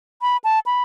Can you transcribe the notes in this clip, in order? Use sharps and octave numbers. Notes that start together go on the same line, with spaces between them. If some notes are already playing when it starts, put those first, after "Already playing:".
B5
A5
B5